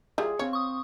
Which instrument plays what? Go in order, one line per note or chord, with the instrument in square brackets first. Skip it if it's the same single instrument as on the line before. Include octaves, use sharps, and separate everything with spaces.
[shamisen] G3 E4 F4 [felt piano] G#4
[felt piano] C4 F5 [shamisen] C#5
[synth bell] C#6 D#6